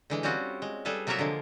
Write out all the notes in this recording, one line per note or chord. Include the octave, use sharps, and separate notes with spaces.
D3 E3 G#3
G3 C4 C#4 F4 F#4
G#3
G3 G#4 A4 B4 F5
C3 F#3 A#3 F4 A#4 E5
D3 F3 G#3